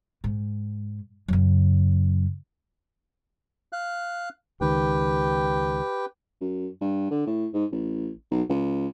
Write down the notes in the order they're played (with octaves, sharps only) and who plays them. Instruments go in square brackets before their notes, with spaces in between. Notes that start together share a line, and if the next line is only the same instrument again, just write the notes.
[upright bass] G#2
F#2 C#3
[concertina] F5 F#6
[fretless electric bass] C#2 D#3 [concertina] G4 B4 G5
[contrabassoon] F#2
G2
D3
A2
G#2
A1
B1
C#2